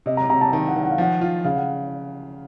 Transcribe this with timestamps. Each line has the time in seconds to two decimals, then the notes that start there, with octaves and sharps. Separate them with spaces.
0.06 C3 D#5
0.17 A#5
0.29 C3 A#5
0.41 A5
0.53 D#3 A5
0.68 F#5
0.76 D#3
0.83 F#5
0.91 F5
0.98 F3 F#5
1.21 F4
1.44 C#3 F5
1.56 F#5